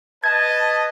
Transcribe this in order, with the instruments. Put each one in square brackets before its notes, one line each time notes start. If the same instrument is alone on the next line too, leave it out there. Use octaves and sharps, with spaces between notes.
[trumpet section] B4 D#5 [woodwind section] A5 [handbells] G#6